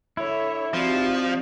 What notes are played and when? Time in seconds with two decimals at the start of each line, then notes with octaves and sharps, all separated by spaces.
0.17 D3 E4 C#5 E5
0.73 F3 C4 D#4 F#4 G4 D5